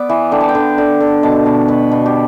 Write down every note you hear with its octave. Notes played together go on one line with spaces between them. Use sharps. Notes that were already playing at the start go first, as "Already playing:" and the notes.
Already playing: B3 D5 E5
E3
D3 G5
A5
G5
D3
D3
D3
B2 A5
B2
B2 B4
B2
G4